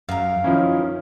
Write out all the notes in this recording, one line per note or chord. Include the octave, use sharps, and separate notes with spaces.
F#2 A#4 F5
D#3 F3 C#4 E4